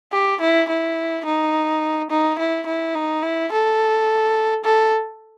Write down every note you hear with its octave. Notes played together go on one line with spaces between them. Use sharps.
G4
E4
E4
D#4
D#4
E4
E4
D#4
E4
A4
A4